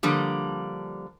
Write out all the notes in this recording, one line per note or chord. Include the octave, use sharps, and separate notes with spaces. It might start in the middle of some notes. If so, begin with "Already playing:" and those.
D3 F3 G3 A#3